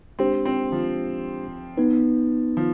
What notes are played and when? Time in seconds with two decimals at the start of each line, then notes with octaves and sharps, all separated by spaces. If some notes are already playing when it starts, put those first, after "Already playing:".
0.19 G#3 C4 D4 G4 C5
0.45 C4
0.72 F3
1.77 B3 D#4 B4
2.57 F3